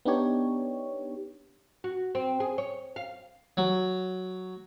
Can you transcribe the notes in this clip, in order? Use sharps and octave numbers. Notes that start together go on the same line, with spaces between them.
B3 D4 D#4 G4 C#5
F#4
C4
G#4
C#5
F5
F#3